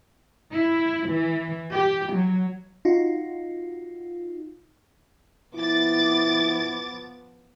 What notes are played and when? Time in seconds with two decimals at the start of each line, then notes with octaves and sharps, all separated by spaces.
0.53 E4
1.08 E3
1.72 G4
2.12 F#3
2.85 D#4 F4 F#4
5.56 F3 B3 E4 D6 A6